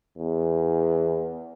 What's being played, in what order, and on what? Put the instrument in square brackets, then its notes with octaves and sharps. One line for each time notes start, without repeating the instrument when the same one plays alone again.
[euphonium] E2